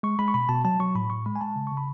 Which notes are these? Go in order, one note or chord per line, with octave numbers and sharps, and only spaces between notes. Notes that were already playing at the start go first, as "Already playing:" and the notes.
G#3 C#6
G#3 B5
C#6
B2 B5
B2 A5
F#3 A5
F#3 C#6
A2 B5
A2 C#6
G#3 B5
G#5
G#3 A5
C#3
C#3 C#6
B5